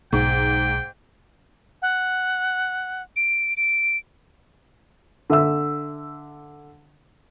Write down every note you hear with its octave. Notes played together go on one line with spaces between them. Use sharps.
B1 G#2 G5
F#5
D7
D7
D3 E5 E6